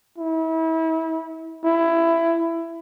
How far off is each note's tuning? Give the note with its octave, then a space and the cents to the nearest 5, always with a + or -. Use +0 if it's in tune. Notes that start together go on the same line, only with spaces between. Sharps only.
E4 -35
E4 +15